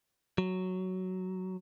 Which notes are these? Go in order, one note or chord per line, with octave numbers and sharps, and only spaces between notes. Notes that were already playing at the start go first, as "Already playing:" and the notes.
F#3